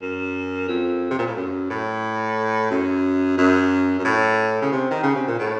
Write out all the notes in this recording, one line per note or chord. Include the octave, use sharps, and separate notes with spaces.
F#2
F2
C3
A#2
A2
F#2
A2
F#2
F#2
F#2
A2
C#3
C3
D#3
C#3
C3
A#2
A2